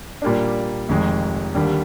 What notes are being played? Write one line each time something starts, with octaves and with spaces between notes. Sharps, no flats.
A#2 G3 A#3 D4
F1 F2 D#3 G#3
D#2 D3 G3 A#3